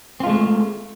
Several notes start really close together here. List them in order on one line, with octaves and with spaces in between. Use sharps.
C4 F4 G#3 A3